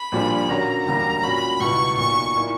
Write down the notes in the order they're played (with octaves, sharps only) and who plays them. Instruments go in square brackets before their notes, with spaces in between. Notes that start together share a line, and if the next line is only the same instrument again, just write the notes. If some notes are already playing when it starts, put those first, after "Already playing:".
Already playing: [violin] B5
[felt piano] A#1 A#2 G3 A#3 D4
[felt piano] D3 A#3 C#4 F#4 C#5 [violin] A#5
[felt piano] E1 D2 D3 G3 A#3 [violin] A#5
[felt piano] A#2 F#3 C#4 F#4 [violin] B5
[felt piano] C#2 B2 G3 B3 E4 [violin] C#6
[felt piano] B1 A#2 A#3 [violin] C#6
[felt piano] A#2 A#3 E4